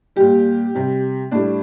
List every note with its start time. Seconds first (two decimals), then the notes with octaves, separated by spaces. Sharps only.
0.16 A#2 G3 G4
0.74 C3 G3
1.31 A2 G3 D4